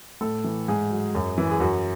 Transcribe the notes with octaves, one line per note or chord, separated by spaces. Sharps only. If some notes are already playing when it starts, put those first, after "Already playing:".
A2 A4
E3
G#2 G#4
F#3
F#2
E3
G#4
F#2 F#4